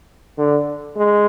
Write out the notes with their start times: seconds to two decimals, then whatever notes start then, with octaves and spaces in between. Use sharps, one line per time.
0.38 D3
0.96 G#3